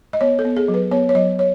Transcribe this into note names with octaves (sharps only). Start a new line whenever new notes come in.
D#5
B3 C#5
A4
B3
G#4
F#3
B4
B3 C#5
C#5
F#3 D#5
C#5